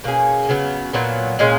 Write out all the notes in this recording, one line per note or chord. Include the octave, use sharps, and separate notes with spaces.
B2 A#3 C#4 G#4
C#3 F#3 B3
A#2 F#3 B3
A#2 G#3 C#4